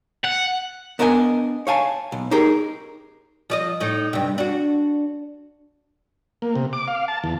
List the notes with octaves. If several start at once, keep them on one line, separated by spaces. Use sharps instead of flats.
F#5
B3 D4 A#4 D#5 E5 G#5
C#5 F5 G#5 A5
B1
D#4 G4 G#4 A#4
F3 D5 D#5
A2 D#4
G2 C3
D4 F#4
A#3
C3
D6
F5
A5
E2